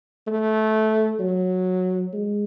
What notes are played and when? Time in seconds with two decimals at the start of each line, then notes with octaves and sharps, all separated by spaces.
0.27 A3
1.20 F#3
2.13 G#3